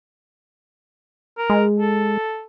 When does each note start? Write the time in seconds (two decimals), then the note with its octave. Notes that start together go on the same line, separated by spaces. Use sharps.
1.38 A#4
1.50 G#3
1.79 A4